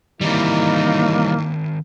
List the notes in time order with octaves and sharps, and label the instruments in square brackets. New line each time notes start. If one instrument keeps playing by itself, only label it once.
[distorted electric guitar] D#3 C4 [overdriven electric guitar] E3 G3 [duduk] A#3 [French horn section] D#4 E4